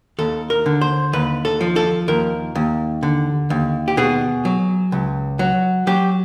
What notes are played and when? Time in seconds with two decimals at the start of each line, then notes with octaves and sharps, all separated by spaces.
0.19 D#2 A4
0.50 A#4
0.66 D3
0.81 C5
1.13 D#2 B4
1.45 A4
1.61 F3
1.76 A4
2.08 D#2 A#4
2.55 D#2
3.03 D3
3.50 D#2
3.88 G4
3.97 B2 G#4
4.45 F#3
4.92 C#2
5.39 F#3
5.87 F#3 G4